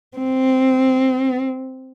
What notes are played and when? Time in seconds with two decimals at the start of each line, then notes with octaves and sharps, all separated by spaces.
0.17 C4